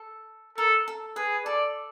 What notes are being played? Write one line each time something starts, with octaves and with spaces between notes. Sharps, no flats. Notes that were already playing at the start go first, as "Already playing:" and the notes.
Already playing: A4
A4 A#4
A4
G#4 B4
A4 D5